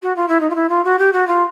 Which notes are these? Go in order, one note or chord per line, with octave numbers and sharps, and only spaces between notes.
F#4
F4
E4
D#4
F4
E4
F4
F#4
G4
F#4
F4